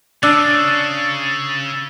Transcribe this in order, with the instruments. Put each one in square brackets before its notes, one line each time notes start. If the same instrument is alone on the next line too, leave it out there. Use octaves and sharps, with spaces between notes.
[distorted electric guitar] C#3 [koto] D4 [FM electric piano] E6 A6